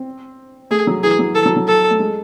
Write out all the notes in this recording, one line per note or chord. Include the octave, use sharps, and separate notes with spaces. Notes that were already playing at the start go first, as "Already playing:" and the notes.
Already playing: C4
A3 G#4
F#3
E3 G#4
F#3
E3 A4
F#3
F#3
A4
A3
G#3